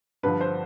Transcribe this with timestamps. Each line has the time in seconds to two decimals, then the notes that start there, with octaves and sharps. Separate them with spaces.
0.23 G2 D3 F3 B4
0.40 C5